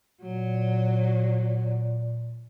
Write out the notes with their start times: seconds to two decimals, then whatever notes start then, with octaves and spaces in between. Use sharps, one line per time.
0.22 A#2 F#3